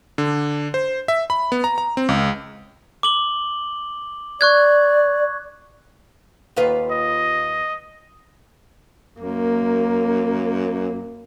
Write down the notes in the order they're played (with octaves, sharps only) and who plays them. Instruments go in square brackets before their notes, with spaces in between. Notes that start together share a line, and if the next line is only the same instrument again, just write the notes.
[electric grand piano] D3
C5
E5
B5
B3
A#5
A#5
C4
C#2
[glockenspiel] D6 F#7 G7
[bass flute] D5 [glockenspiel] C#6 F#6 G#6
[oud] D#2 F4 B4
[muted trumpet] D#5
[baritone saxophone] F#2 [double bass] A#3